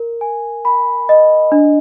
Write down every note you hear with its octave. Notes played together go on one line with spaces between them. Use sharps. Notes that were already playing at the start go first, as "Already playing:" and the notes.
Already playing: A#4
G#5
B5
D#5
D4